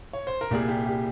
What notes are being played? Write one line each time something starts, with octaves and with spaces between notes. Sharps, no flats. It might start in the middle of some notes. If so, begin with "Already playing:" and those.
C#5
C5
A#4
C2 A#2 G3 G#4
G4
G4